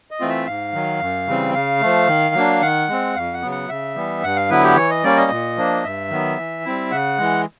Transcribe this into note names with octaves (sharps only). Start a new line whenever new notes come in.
D#5
E3 A3 C4 F4
E5
G#2 F5
D#3 F#3
F#2
C#3 E3 G3 C4
C#3 F5
F3 A3
D#3
F#3 A#3 D4
D#3 F#5
G#3 C4
F2 F5
F#5
C#3 F#3 B3
F#5
C#3 E5
E3 G3 B3
G2 F#5
F5
D3 F#3 B3 E4 B4
G4
E3 C#5
D#5
G3 A#3 C#4 D5
D#5
A#2
F3 A#3 D4
G2 E5
D#3 F#3 B3
E3
G3 C4 E4
C#3 F#5
E3 G#3